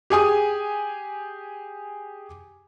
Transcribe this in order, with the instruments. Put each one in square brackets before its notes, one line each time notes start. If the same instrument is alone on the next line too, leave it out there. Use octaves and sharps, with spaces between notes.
[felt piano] G4 G#4 G#5 D#6